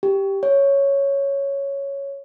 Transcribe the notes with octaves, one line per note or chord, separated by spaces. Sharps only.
G4
C#5